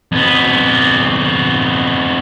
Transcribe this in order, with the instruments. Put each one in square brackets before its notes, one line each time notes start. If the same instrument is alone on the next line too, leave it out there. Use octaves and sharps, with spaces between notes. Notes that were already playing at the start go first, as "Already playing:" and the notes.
[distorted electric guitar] F2 B3